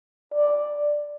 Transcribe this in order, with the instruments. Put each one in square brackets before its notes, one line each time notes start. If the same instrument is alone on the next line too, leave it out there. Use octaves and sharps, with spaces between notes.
[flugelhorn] D5